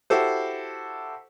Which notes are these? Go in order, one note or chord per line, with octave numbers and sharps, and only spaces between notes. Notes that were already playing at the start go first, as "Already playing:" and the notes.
E4 F#4 G4 A4 C5